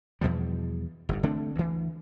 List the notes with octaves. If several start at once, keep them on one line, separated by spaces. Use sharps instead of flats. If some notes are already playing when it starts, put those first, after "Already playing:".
E2 B2 F3 G3
G1 G#2
D3 A3 C4 D4
D2 E3